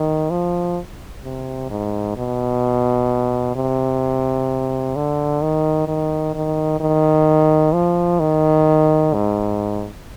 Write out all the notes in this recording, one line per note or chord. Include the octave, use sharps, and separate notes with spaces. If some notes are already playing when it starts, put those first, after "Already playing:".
Already playing: D#3
F3
C3
G#2
B2
C3
D3
D#3
D#3
D#3
D#3
F3
D#3
G#2